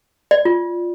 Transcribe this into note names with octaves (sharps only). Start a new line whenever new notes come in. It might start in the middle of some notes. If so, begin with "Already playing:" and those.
D5
F4